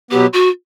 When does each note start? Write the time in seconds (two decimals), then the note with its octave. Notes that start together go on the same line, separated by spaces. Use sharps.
0.11 B2 F#3 B3 G4
0.33 F#4